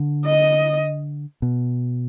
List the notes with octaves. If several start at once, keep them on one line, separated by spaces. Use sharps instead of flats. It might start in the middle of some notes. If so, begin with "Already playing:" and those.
Already playing: D3
D#5
B2